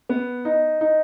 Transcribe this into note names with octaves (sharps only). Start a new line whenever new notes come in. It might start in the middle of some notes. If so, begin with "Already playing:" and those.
B3
D#4
D#4